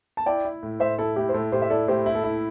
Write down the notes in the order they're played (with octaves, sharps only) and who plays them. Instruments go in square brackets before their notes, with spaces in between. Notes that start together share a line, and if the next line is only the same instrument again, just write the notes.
[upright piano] A5
[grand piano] E4 [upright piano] D5 G5
[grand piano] E4
A2
[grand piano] A2 [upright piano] C5 E5
[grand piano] E4 [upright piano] A4
[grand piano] A2 [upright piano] G4
[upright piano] C5
[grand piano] A2 [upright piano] A4
[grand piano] A2 [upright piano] G4 C5
[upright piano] E5
[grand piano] E4 [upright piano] A4 D5
[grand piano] A2 [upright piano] G4 C5
[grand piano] E4
[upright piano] A4
[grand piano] E4